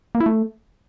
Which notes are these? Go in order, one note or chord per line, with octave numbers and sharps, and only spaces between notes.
A#3
E4
A3